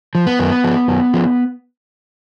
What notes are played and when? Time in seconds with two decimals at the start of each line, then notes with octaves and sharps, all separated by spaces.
0.15 F3
0.26 B3
0.39 F#2
0.64 F3
0.88 F#2
1.13 F3